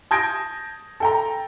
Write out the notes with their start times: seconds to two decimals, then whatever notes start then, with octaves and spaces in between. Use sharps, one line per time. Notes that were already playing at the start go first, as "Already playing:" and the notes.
0.11 A5 D#6 G6 G#6 A#6 D7
1.00 A4 G5 A#5